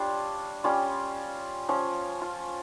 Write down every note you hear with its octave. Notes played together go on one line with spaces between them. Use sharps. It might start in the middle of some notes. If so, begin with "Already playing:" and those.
Already playing: G3 D4 F4 C#5
G3 C#4 F4
F3 C#4 F4 C#5
F4